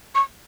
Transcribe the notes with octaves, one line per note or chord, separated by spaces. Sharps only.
C#6